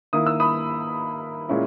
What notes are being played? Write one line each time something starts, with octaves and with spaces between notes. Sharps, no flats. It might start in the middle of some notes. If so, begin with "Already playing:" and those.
D#3 A#3 E4 D#6
E6
B5 D#6
A#2 G#3 C#4 E4